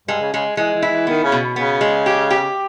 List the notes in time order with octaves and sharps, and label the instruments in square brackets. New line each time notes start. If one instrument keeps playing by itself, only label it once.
[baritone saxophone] G2 [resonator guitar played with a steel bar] G#3
[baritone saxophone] C#3
[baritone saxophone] C#3 [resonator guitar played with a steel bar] G#3
[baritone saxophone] E3 [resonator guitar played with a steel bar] G#3
[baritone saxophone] E3
[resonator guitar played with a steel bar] E4
[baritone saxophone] E3
[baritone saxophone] D#3 [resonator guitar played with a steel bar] B3
[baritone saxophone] C#3
[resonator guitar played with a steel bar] B2
[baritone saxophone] C#3 [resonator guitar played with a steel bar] B3
[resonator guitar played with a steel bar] G#3
G4
G4